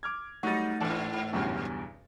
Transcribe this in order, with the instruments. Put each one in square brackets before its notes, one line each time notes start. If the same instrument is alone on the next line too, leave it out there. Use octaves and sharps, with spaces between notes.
[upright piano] D6 F6 G#6
[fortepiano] F#3 G3 [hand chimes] A3 F#5 [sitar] D#4 [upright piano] C#6 A6
[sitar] G#2 E3 [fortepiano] D4 A4 D5
[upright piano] B1 E2 G2 [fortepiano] C#3 C#4